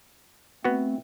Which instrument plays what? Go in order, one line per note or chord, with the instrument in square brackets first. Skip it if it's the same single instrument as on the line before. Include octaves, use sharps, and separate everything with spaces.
[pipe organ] A3 C4 [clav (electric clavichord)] B3 F#4